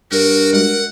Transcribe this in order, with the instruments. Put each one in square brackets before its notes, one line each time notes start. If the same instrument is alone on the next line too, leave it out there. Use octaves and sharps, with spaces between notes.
[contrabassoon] G2 [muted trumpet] F#4 [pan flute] A#4
[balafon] G3 G#3 F#4 [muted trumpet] F#5